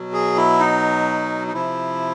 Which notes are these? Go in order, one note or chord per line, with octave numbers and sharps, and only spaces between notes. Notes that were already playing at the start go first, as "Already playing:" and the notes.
Already playing: B2 F#3
G#4
E4
D#4
D#4
C3 F3 E4